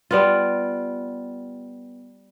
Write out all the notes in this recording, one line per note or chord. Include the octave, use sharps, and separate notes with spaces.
G3 B3 F4